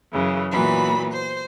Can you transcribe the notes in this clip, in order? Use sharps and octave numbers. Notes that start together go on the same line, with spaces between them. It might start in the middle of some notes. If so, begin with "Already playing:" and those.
F#2 C#3 E3
A#2 E3 F#3 B3 B5
C5